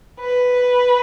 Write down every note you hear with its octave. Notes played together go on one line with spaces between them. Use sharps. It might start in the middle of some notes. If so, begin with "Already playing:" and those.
B4